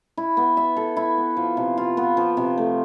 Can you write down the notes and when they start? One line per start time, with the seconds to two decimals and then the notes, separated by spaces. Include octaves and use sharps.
0.17 E4
0.37 B3
0.57 E5
0.77 A4
0.97 E4
1.17 B3
1.37 F3
1.57 C3
1.78 F4
1.97 B3
2.17 F3
2.37 C3
2.58 A3